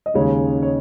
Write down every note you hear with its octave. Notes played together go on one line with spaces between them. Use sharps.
D#5
D#2 C#3 G#3 D#4 C#5
C#5